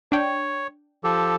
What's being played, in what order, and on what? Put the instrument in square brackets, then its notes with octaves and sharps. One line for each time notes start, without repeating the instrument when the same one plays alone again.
[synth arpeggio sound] D4 G5 [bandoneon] C#5
[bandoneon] F3 G4 A4